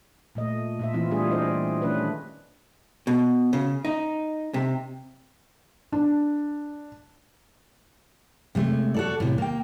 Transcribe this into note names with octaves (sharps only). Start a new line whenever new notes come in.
A#2 A3 D#5
A#2 F4 E5
E3 C4 E4 F4
G3 A3 D4 F4 G#4
G3 C5 D5 D#5
D#3 G3 A3 C#4 D4 B4
B2
C#3
D#4
C3
D4
C3 G#3 A3
F#4 A4 D5
A2 C3
A#3 G5